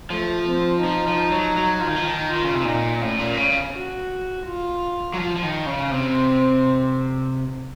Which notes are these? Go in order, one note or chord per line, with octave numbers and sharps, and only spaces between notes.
F3 A3
C4
F3 D#4
F3
F#3
F#3
F3
D#3
F3
D#3
F4
D#3
C#3
C3
A#2 D#4
A2 C#4
A#2
C#3
F#4
F4
F#3
F3
F3
D#3
C#3
C3 C4